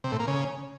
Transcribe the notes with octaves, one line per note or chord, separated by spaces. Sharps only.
C3
A2
A#3
C#3